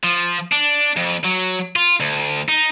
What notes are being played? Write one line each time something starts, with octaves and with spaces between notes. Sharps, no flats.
F3
D4
F2
F#3
F4
D2
D#4